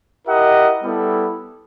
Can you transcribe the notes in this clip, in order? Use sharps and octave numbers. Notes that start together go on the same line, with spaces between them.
E4 G4 A#4 D#5 F#5
G3 B3 E4 A4